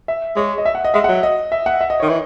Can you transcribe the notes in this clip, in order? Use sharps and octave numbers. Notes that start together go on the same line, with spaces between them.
E5
G#3 C#5
D#5
E5
F#5
D#5
G#3 E5
F#5
F#3
D#5
E5
F#5
E5
D#5
D#3 C#5
E3